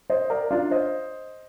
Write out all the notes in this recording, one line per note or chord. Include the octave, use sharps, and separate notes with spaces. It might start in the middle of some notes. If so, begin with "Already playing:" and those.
C5 D#5
A#4 D5
D4 F4
C5 D#5